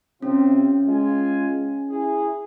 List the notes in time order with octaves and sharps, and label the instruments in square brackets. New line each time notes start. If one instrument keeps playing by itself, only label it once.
[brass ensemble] C3 C4 F4 [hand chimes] C#4
[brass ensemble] G#3 F4 G#5
E4 G#4